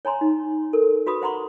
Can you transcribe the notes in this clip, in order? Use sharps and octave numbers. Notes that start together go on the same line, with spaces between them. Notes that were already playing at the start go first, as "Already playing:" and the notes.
C#5 G#5 A#5 C6
D#4
A4 A#4
F#4 B4 B5 D#6
C5 F#5 A#5 C6 C#6